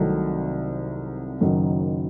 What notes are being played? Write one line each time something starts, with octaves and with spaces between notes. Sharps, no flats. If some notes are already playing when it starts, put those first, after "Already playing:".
Already playing: C2 C3 D#3 F#3 A3
F#1 F#2 D#3 F#3